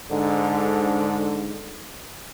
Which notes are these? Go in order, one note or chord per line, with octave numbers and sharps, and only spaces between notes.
G#2 D3